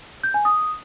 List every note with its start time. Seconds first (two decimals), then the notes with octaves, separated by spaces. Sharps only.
0.24 G6
0.34 G#5
0.45 D#6